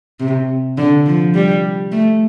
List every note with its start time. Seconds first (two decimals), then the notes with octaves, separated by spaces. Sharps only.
0.20 C3
0.78 D3
1.06 F3
1.34 G3
1.92 A3